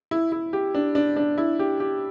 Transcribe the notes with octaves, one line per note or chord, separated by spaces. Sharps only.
E4
E4
G4
D4
D4
D4
E4
G4
G4